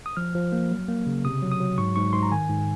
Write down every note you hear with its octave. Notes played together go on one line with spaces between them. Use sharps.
D#6
F3 F6
F3
A#3
F#3
A#3
C#3
C3 D#6
F#3
D#6
F#3
G#2 C#6
G#2 C#6
G#2 C6
A#5
D#3 G#5
G#2